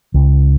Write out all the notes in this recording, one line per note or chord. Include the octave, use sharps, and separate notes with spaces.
C#2